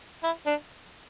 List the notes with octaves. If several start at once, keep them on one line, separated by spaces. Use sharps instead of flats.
E4
D4